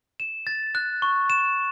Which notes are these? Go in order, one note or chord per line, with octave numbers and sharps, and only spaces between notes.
E7
A6
F#6
C#6
E7